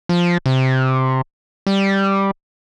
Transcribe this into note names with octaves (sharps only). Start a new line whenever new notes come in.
F3
C3
G3